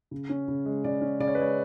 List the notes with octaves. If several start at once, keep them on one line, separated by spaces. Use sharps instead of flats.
C#3
C#4
C#3
G#3
C#3 D5
C#4
C#3 D5
C#5
B4
G#3 C#5